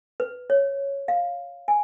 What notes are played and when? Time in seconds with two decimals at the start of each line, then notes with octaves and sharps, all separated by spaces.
0.20 B4
0.50 C#5
1.08 F5
1.68 G#5